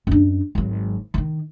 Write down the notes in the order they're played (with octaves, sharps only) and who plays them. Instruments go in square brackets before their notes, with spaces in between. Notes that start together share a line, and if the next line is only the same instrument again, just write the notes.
[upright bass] F#2 D4
G#1 F#3
D#3 E3